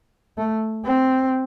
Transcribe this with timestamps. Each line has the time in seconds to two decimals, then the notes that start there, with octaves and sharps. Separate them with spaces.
0.37 A3
0.85 C4